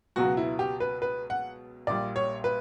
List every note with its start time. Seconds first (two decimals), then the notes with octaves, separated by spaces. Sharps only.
0.16 C#2 B2 F#3 F#4
0.37 E4
0.59 G4
0.80 B4
1.02 B4
1.30 F#5
1.87 A#1 A#2 G3 D5
2.16 C#5
2.44 B4